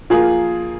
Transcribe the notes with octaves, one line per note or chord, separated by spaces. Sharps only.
F3 A#3 F4 G#4